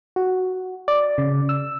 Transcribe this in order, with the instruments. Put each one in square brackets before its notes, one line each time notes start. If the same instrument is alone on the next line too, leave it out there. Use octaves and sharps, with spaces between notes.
[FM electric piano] F#4
D5
C#3
E6